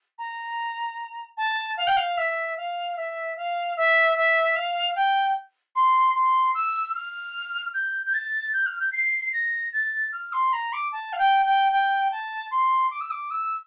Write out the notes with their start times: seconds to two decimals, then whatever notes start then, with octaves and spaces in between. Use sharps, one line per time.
0.18 A#5
1.37 A5
1.77 F5
1.87 G5
1.96 F5
2.17 E5
2.57 F5
2.96 E5
3.36 F5
3.76 E5
4.16 E5
4.55 F5
4.95 G5
5.75 C6
6.14 C6
6.54 E6
6.94 F6
7.74 G6
8.06 G6
8.14 A6
8.53 G6
8.66 F6
8.80 G6
8.92 C7
9.33 A#6
9.72 A6
10.12 F6
10.32 C6
10.53 A#5
10.73 D6
10.92 A5
11.12 F5
11.18 G5
11.45 G5
11.72 G5
12.11 A5
12.51 C6
12.91 D6
13.00 E6
13.11 D6
13.30 E6